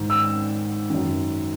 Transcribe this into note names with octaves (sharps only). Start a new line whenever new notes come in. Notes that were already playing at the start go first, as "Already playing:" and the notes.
Already playing: G#2 D#3
E6
F#2 D#3